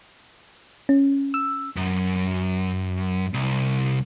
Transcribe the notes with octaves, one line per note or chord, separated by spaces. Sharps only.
C#4
E6
F#2
C2